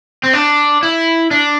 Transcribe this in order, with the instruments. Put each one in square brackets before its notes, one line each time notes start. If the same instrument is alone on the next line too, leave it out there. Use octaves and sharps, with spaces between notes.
[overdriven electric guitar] C4
D4
E4
D4